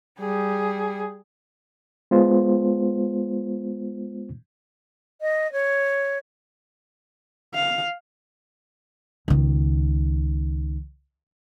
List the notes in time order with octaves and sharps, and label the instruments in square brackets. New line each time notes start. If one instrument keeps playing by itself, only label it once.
[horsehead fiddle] G3 G#4
[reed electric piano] G#3 B3 F4 C5
[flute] D#5
C#5
[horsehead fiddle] F5
[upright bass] C#2 D#3